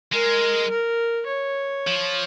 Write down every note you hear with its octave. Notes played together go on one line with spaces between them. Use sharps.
G#3 A#4
A#4
C#5
F3